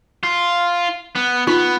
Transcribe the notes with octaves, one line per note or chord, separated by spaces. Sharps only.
F4
B3
B3 D#4 F4 C#6